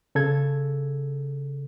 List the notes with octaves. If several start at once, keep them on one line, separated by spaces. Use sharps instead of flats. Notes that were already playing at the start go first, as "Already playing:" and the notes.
C#3 A4 G#6